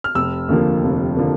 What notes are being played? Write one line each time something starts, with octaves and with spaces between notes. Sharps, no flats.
F6
F1 E6
D#2 D3 F3 A#3
F1
D3 F3 A#3